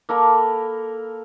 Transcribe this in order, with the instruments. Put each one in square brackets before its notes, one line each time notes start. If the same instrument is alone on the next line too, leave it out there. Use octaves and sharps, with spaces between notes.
[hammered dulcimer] A#3 A4 A#4 B5